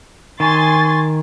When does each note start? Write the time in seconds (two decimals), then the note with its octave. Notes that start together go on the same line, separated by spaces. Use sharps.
0.40 D#3 G#5 C6 C#6 A6